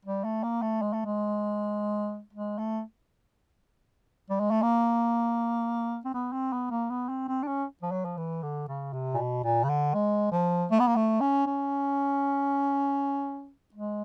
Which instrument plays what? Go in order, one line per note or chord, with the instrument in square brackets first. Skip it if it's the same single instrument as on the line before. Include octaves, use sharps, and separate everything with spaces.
[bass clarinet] G3
A3
A#3
A3
G#3
A3
G#3
G#3
A3
G3
G#3
A3
A#3
C4
B3
C4
B3
A#3
B3
C4
C4
D4
C#4
F3
F#3
F3
E3
D3
C#3
C3
A#2
B2
A#2
C#3
D3
G#3
F3
A3
B3
A#3
A3
C#4
C#4
G#3